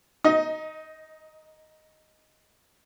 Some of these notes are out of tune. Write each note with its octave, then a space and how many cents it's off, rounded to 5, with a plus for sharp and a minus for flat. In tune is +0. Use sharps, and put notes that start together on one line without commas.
D#4 +0 D#5 +25